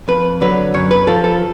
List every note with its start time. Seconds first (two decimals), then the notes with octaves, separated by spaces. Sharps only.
0.08 F2 B4
0.41 D3 F#3 B4
0.74 F#2 C#5
0.91 B4
1.07 F3 A4
1.24 A4